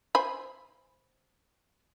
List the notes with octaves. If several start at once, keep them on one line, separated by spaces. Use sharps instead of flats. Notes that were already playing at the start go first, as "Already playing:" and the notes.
C5 G#5 B5